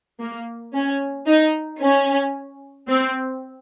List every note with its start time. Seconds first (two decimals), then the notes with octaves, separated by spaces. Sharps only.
0.20 A#3
0.74 C#4
1.27 D#4
1.81 C#4
2.88 C4